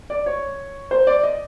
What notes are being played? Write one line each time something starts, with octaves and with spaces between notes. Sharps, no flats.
D5
C#5
C5
D5
D#5